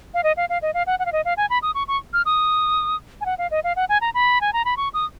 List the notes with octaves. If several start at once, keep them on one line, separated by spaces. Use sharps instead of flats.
F5
D#5
F5
F5
D#5
F5
F#5
F#5
F5
D#5
F5
G#5
B5
D#6
C#6
C#6
F6
D#6
G#5
F#5
F5
D#5
F5
F#5
G#5
A#5
B5
G#5
A#5
B5
C#6
D#6